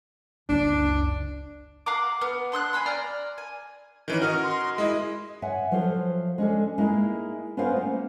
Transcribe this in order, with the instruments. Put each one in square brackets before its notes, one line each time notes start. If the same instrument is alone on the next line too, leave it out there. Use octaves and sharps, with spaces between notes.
[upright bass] F#1 C#2 [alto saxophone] D4
[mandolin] F5 F#5 A#5 D6
B3 F6
D4 C6 E6 F#6
G#5 A5 B5 C6
D5 A#5 F6
G#5
[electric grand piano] D#3 E3 C#4
[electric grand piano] F#4 A#4 D#5 [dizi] F6
[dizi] C6
[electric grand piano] G#3 E4 [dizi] D#5
[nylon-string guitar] C#5 E5 F#5 G#5
F3 F#3 F4 A4 C5
G#3 C#4 D4 A4
G#3 A#3 D#4 E4
B3 C#4 F4 A#4 C5 F5
A3 A#3